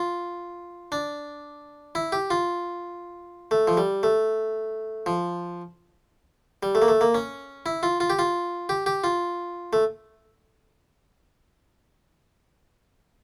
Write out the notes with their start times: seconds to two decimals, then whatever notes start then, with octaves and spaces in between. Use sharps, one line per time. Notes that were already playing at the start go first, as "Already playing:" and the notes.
Already playing: F4
0.92 D4
1.95 E4
2.12 G4
2.30 F4
3.51 A3
3.68 F3
3.77 G3
4.03 A3
5.06 F3
6.63 G3
6.75 A3
6.82 A#3
6.88 A3
7.01 A#3
7.14 C#4
7.66 E4
7.83 F4
8.00 F4
8.10 G4
8.19 F4
8.69 G4
8.86 G4
9.04 F4
9.73 A3